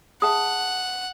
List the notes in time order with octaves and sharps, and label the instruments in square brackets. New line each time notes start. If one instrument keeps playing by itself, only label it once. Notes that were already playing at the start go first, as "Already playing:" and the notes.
[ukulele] G#4 E5 A5 [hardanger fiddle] F#5 [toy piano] D#6